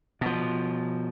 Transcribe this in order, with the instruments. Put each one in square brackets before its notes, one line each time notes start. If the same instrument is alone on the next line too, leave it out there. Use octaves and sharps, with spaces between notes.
[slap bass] B2 F3